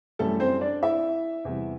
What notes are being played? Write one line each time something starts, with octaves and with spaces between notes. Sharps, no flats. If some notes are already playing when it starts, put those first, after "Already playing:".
F#2 E3 G3 A3 A4
C4 C5
D4 D5
E4 E5
E2 C3 G3